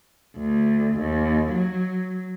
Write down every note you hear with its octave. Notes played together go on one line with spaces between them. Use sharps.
D2
D#2
F#3